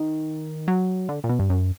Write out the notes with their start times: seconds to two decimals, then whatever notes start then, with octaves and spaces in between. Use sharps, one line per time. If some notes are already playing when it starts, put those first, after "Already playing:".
Already playing: D#3
0.68 F#3
1.09 D3
1.24 A#2
1.29 B2
1.39 G2
1.50 F#2